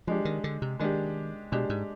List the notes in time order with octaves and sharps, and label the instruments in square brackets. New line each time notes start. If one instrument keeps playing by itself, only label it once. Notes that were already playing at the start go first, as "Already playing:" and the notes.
[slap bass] F3 [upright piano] G#3 D4 G4
[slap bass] D#3
D3
C3
[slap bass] D#3 [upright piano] G#3 D4 G4
[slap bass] B2 [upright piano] G#3 D4 G4
[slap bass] G#2